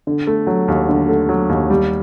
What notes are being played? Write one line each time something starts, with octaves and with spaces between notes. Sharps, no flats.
D3
A3
F#3
D#2
D3
A3
F#3
D#2
G3